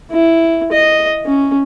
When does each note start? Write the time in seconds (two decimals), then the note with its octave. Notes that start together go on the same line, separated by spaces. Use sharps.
0.11 E4
0.72 D#5
1.26 C#4